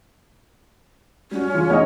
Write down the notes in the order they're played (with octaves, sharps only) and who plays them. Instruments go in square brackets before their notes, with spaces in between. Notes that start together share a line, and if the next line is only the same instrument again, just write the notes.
[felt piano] G3 F#4 [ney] C#4
[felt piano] C#3 E3 F4
[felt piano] G#3 B3 D#4 [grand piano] C#5 D#5